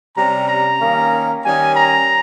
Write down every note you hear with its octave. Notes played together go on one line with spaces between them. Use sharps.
C3 G3 C#4 A#5
A#5
D#3 A#3 C#4
D#3 G3 C#4 G#5
A#5